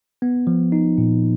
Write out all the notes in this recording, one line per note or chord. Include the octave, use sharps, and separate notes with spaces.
B3
F3
D#4
A#2